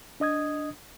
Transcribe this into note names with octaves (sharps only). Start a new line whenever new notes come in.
D4 D#5 D#6 G#6